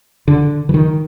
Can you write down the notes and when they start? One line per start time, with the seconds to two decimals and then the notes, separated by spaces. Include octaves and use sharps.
0.28 D3
0.69 E3
0.74 D#3